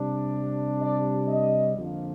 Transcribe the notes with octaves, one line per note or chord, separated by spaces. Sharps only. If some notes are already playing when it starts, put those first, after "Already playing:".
Already playing: C3 G3 D4
D5
D#5
F2 D3 F3 A#3